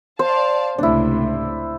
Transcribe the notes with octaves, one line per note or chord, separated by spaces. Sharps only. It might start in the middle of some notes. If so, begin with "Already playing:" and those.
C5 D5 F5 A5
C#2 A2 C3 D4 E4